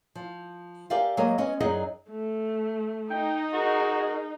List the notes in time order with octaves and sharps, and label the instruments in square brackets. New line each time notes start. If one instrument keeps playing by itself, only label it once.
[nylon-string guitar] F3
G4 A#4 D5 E5 F5 G#5
F#3 G#3 A#3 G4 A#4 D#5
G#3 B3 C#4 D#5
F#2 D#4 G#4 D5 D#5 F#5
[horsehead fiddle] A3
[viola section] D#4 [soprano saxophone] G5
[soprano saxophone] F#4 [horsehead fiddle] G#4 A#4